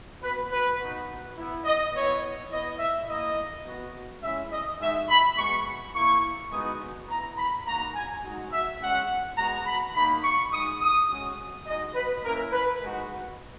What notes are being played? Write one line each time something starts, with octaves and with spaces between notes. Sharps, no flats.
B3 F#4 B4
B4
B3 D#4 F#4
B3 E4
D#5
B3 E4 C#5
B3 E4 D#5
E5
A#3 E4 D#5
B3 F#4
G#3 C#4 E4 E5
D#5
G#3 D#4 F#4 E5
B5
G#3 B3 F#4 C#6
A#3 E4 C#6
G#3 B3 D#4 F#4 D#6
B3 E4 A#5
B5
A#3 D#4 F#4 A#5
G#5
G#3 D#4 F#4
E5
G#3 C#4 F#4 F#5
G#3 B3 F#4 A#5
B5
A#3 D#4 F#4 B5
C#6
G#3 D#4 F#4 D#6
D#6
G#3 C#4 F#4
G#3 D#4 F#4 D#5
B4
A#3 C#4 E4 A#4
B4
G#3 D#4 F#4